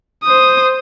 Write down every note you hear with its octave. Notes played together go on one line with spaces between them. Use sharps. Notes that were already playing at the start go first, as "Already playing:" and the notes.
C5 D#6